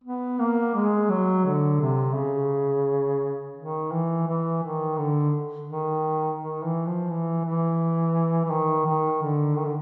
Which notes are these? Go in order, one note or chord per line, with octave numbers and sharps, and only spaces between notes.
B3
A#3
G#3
F#3
D3
C3
C#3
D#3
E3
E3
D#3
D3
D#3
D#3
E3
F3
E3
E3
E3
D#3
D#3
D3
D#3
D3